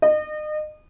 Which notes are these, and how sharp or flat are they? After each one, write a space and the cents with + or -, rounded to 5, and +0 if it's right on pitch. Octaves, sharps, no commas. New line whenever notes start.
D#5 -35